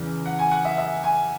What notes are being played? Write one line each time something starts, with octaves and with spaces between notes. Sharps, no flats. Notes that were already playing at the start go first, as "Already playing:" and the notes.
Already playing: E2 C#3 E3
F#5
G#5
F#5
E5
E5
G#5